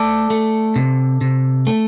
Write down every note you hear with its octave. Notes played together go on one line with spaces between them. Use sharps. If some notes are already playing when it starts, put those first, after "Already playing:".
Already playing: A3 A4 D5
A3
C3
C3
A3